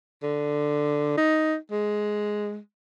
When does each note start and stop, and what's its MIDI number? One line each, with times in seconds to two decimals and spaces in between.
0.23 1.13 50
1.17 1.56 63
1.71 2.58 56